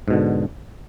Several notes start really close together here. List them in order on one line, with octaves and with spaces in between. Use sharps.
G#2 B2 D3